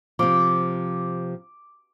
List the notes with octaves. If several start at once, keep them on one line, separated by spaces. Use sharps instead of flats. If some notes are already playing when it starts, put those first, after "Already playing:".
C3 F3 D6